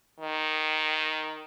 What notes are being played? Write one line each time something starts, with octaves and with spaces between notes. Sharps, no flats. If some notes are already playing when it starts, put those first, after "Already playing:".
D#3